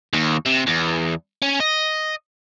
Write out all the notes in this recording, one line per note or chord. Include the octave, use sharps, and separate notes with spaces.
D#2
C3
E2
C#4
D#5